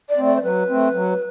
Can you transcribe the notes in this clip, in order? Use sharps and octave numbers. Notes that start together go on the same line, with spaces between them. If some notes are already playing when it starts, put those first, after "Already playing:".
D5
A3 C4
D5
C5
F#3 B4
A3 C4
F#3